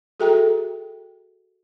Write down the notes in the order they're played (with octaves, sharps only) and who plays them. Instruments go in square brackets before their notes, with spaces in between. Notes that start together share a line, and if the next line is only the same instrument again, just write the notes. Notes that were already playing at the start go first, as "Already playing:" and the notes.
[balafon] F#4 G#4 A4 E5 G5 A#5